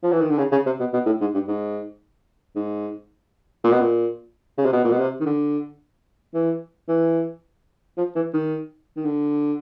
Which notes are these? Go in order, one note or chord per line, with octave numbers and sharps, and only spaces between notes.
F3
E3
D#3
D3
C#3
C#3
C3
B2
B2
A2
G#2
G2
G#2
G#2
A#2
B2
A#2
C#3
C3
B2
A#2
B2
C3
D#3
D3
E3
E3
F3
E3
D#3
D#3
D3